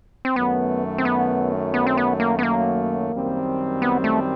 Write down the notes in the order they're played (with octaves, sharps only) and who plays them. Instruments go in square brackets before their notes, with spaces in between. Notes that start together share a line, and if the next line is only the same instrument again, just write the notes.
[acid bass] C4
[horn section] F#2 D#3 F#3 A3 [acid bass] B3
[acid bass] C4
B3
B3
C4
B3
A#3
B3
A#3
[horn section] F#2 D#3 G3 C4
[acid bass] B3
A3